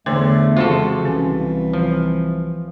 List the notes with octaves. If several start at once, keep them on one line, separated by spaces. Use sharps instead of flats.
E2 D3 E3 A3 B3 C#5
F2 C#3 E3 F3 G#3 F4 F#4 A4
C2 E3 C#4
F3